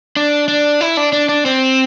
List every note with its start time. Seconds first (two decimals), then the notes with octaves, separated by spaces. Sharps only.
0.16 D4
0.48 D4
0.81 E4
0.97 D4
1.13 D4
1.29 D4
1.46 C4